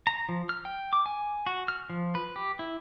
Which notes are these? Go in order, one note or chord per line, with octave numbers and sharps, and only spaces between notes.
A#5
F3
F6
G5
D6
G#5
F#4
F6
F3
B4
G4
E4